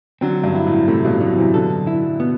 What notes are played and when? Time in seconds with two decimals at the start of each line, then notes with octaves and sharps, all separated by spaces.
0.21 D3 F#3 C4
0.44 G2
0.55 E4
0.66 A2
0.88 A2 C3 A3
1.05 G2 B2
1.20 B2 D3 F#3
1.37 C3 E3
1.54 B2 D3 A4
1.87 E4
2.20 B2 B3